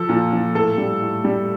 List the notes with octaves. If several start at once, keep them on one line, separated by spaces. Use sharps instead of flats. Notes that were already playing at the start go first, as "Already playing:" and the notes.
Already playing: F3 A4
A#2
F3
A2 A4
G3
A2
G3